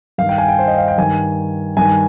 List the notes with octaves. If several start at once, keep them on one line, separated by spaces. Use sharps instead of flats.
G2 D#3 F5
G5
G#5
G5
C5
D#5
F5
G5
G2 D#3 G#5
G2 D#3 G#5